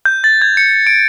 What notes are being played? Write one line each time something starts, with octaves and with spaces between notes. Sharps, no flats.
G6
A6
G#6
C#7
D7